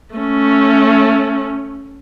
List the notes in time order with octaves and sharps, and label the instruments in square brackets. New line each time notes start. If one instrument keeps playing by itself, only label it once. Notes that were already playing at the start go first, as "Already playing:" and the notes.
[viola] A3 C#4